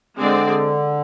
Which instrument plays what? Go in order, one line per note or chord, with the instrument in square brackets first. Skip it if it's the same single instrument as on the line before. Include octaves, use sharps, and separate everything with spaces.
[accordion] D3 [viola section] G#3 C4 G#4 D5